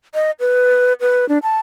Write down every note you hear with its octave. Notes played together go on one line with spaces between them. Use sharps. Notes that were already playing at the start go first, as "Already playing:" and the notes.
D#5
B4
B4
D4
A5